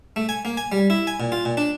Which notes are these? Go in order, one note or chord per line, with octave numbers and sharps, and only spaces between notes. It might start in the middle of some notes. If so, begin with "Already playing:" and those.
A3
G#5
A#3
G#5
G3
E4
G#5
A#2
F4
A#2
D4